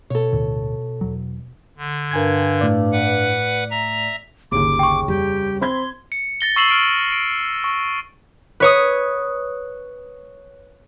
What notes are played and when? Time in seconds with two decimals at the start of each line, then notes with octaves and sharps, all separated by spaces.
0.10 B2 A4 C#5
0.32 D2 A2 D3
1.01 E2 F#3
1.78 D3
2.11 G2 A#4 G#5 G#6
2.61 A2 D5
2.92 B4 F#5
3.71 E5 A#5
4.52 G1 D#2 C#3 D6
4.79 G5 C#6
5.08 F2 G3 G4
5.61 C4 B5 C6 G#6
6.12 C#7
6.41 A6 A#6 G7
6.56 C#6 E6 C7 E7 F#7
6.71 F6 D7
7.12 D7
7.64 C#6
8.60 B4 C#5 D#6